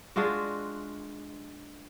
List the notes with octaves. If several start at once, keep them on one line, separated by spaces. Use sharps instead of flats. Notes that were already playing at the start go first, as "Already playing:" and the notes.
G#3 D4 F4 F#4